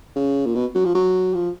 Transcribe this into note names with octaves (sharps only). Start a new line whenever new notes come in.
C#3
A#2
B2
F#3
F3
F#3
F3